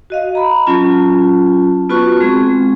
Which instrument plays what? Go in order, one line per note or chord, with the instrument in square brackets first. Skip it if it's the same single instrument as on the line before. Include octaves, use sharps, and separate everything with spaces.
[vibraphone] F#4 D#5 F5
A#5 B5
F#3 C#4 F4 A5
B3 F4 F#4 B4 A5 C#6
G#3 C4 G#4